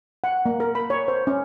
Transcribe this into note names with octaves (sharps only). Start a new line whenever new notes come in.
F#5
A#3
A#4
B5
C#5
C5
C#4